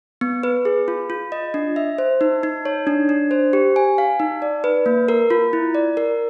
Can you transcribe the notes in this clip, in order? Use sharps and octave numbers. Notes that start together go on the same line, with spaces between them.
B3
B4
G#4
F4
F4
D#5
D4
E5
C5
D#4
D#4
C#5
D4
D4
C5
G4
G#5
F5
D#4
D5
B4
A#3
A#4
F4
E4
D5
A#4